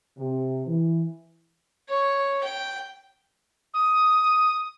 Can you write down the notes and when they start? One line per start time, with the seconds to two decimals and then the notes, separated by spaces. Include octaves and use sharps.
0.18 C3
0.66 E3
1.89 C#5
2.44 G5
3.74 D#6